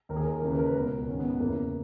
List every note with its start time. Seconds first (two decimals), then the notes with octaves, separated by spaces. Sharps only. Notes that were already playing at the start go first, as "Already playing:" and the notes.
0.09 D#2 D#3 A#4
0.16 G#4
0.24 A#4
0.42 D#2 C#3 E3 A#4
0.50 B4
0.59 A#4
0.66 B4
0.74 C#2 B2 A#4
1.07 G#2 D#3 C#4
1.19 B3
1.29 B3
1.40 E2 C#3 E3 A#3